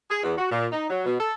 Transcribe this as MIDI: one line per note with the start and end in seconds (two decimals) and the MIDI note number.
0.09 0.22 68
0.23 0.32 40
0.37 0.47 66
0.51 0.66 46
0.72 0.86 63
0.89 1.04 54
1.05 1.16 47
1.18 1.33 69